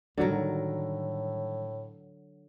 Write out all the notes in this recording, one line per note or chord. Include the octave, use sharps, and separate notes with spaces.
A2 D3 D#3 F#3 G3 A#4